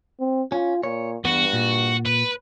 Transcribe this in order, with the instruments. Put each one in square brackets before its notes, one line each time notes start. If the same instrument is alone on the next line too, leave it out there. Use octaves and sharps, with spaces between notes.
[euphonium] C4
[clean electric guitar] C#4 [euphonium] F4
[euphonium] A#2 [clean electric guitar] C#5
[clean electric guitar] E2 B3 [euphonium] G2 [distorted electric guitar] F#4
[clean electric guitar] A#2
[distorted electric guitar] B4